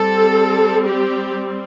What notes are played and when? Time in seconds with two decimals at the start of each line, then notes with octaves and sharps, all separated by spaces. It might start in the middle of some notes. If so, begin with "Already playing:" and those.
Already playing: G3 C4 A4
0.86 G4